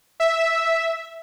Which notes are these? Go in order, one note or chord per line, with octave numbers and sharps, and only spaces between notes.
E5